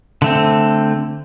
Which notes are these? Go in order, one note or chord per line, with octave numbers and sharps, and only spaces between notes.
D3 A3 C4